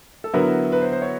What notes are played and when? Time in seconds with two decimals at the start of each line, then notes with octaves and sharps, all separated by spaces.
0.24 A4
0.34 D3 F#3 B3 E4 A#4
0.72 B4
0.82 C5
0.92 C5
1.02 C#5